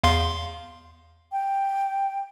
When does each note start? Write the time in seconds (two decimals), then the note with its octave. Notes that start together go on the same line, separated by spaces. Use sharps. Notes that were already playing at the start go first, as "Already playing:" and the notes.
0.04 E2 F5 C6
1.32 G5